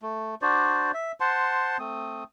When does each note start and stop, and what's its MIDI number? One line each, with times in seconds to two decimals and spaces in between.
0.02 0.35 57
0.42 0.91 62
0.42 0.91 66
0.42 0.91 72
0.42 0.91 74
0.94 1.12 76
1.20 1.77 72
1.20 1.77 78
1.20 1.77 81
1.20 1.77 84
1.79 2.24 57
1.79 2.24 60
1.79 2.24 87